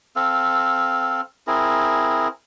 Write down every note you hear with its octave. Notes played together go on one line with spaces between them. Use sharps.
C4 A4 F5
C4 E4 G#4 A#4